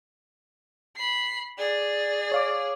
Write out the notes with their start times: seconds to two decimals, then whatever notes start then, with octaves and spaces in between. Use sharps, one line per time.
0.96 B5 C7
1.58 G#4 D5
2.32 C#5 F5 D6